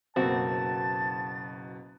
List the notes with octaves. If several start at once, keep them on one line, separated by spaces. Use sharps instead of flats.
F#1 B2 A#3 C4 F#4 A5 A6